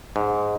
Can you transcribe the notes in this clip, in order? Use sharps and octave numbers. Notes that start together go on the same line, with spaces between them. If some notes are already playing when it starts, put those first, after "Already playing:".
G#2